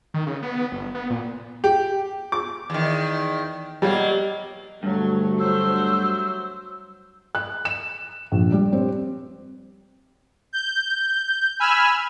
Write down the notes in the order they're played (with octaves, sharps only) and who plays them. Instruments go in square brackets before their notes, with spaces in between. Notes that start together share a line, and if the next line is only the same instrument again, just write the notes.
[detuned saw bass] D#3
C#3
B3
G1
B3
A#2
[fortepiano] G4
D6
[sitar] E2 D#3
[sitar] B2 F#3 A#3 [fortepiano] G3
[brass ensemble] D2 A3 [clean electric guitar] G2 [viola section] F#3
[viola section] F#3 C5 [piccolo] E6
[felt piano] F#6
E7
A#1
G3
C4
[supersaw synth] G6
G#5 B5 E6 F6